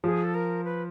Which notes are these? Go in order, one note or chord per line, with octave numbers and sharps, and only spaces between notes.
F3 G#4
A4
A#4
B4